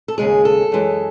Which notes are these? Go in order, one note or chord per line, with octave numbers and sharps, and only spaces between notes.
A4
D#2 C#3 G#3 G#4
A4
F#2 E3 G#3